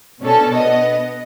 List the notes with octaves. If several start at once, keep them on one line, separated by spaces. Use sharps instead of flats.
B2 C#4 D4 A4
B3 D#5